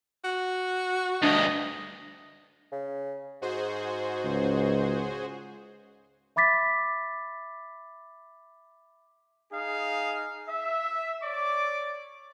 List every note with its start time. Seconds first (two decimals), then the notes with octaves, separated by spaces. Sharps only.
0.25 F#4
1.23 D2 G2 D4 D#5
2.72 C#3
3.42 G#2 F#4 G#4 C5
4.25 C#2
6.36 E5 B5 D6 A6 B6
9.52 D#4 G#4 F5
10.48 E5
11.22 C#5 D5 D6